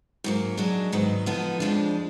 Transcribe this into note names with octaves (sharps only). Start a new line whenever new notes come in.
G#2 F#3 A#3
F#3 D4 G#4 D#5
G#2 D#3 F#3 B3
D3 F3 B3 D#4
F2 F3 G#3 D4